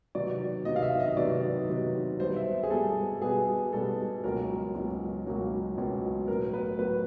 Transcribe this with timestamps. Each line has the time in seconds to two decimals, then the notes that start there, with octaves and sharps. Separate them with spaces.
0.15 C3 D#3 F#3 B3 D5
0.65 C3 D#3 F#3 B3 D#5
0.76 F5
0.83 E5
1.00 D#5
1.16 C3 D#3 F#3 B3 D5
1.68 C3 D#3 F#3 B3
2.19 B2 G3 B3 C5
2.36 E5
2.63 G#4
2.70 B2 G3 B3 A4
3.21 B2 G3 B3 G#4
3.73 B2 G3 B3 A4
4.24 C#2 B2 F#3 A#3 C#4 A#4
4.74 C#2 B2 F#3 A#3 C#4
5.26 C#2 B2 F#3 A#3 C#4
5.78 C#2 B2 F#3 A#3 C#4
6.28 A2 F#3 B3 A#4
6.54 B4
6.79 A2 F#3 B3 B4